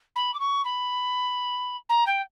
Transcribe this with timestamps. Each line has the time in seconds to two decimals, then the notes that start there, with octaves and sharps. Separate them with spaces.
0.16 B5
0.34 D6
0.40 C#6
0.65 B5
1.89 A#5
2.07 G5